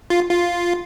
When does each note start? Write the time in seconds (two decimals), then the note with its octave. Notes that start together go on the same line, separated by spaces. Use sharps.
0.10 F4
0.29 F4